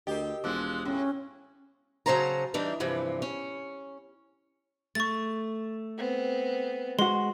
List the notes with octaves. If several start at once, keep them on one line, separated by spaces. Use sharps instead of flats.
D2 G4 A#4 D#5
E1 F3 G#3 D6 E6 F#6
A2 C#4
C#3 F#3 C#4 C5 A5 A#5
E3 G3 D4 D#4
G2 C3 E3 F3
C#4
A3 C#6 A6
B3 C4
G#3 F#4 C6